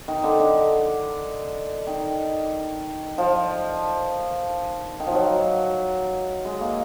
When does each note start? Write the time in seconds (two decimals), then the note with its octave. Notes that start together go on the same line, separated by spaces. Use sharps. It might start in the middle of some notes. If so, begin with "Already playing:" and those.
0.08 D#3
0.24 D3
0.40 D3
1.87 D#3
3.18 F3
5.00 D#3
5.07 F3
5.14 F#3
6.45 G#3
6.61 A#3